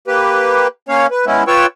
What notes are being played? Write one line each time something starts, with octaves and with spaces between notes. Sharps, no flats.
A#3 G4 B4
A#3 C#4 C#5 F5
B4
G#3 B3 C#4 E4
F4 B4 C#5 G5 C#6 E6